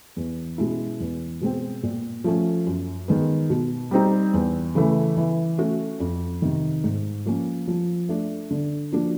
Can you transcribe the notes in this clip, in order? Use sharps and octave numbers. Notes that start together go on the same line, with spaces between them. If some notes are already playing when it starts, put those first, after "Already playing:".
E2
B2 G#3 C#4 E4
E2
B2 G#3 C4
A#2
F3 A3 C#4
F#2
D#3 G#3 B3
B2
G3 C4 D#4
E2
C#3 E3 A3
E3
A3 C#4 F#4
F2
C3 D#3
G#2
F3 A#3 C#4
F3
A3 D4
D3
F3 A#3 D4 F#4